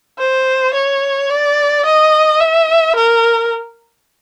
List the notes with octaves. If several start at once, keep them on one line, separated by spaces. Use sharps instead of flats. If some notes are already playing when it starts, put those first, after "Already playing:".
C5
C#5
D5
D#5
E5
A#4